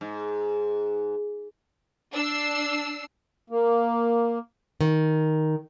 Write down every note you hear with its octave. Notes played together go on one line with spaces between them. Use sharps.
G#2
D4 E6 C7
A#3
D#3